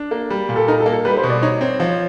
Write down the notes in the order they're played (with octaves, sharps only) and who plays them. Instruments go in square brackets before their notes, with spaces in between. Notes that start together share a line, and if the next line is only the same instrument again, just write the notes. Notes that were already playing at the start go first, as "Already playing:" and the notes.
Already playing: [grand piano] D4
A#3
G3
A#2
[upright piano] A4
[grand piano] D#4 [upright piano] A#4
[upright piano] A4
[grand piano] A#3
[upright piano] A4
[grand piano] G3 [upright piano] B4
[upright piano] C5
[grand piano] B2
[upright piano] D5
[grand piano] D#4 [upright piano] C#5
[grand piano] C4 [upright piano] C#5
[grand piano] F3 [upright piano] C#5